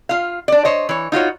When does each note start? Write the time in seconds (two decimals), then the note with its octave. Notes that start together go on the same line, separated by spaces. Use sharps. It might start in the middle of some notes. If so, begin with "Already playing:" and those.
0.09 F4 F5
0.48 D4 D5
0.65 C5 C#5 D#5
0.89 E3 C#5
1.12 D#4 F4 F#4 C#5